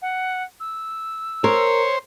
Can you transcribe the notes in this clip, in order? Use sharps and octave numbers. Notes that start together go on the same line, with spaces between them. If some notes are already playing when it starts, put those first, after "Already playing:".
F#5
E6
A#4 C5 C#5